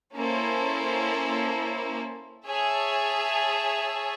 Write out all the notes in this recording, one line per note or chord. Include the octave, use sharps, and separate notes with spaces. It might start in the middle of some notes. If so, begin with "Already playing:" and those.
A#3 C#4 E4 A4 C5
G#4 C#5 E5 A5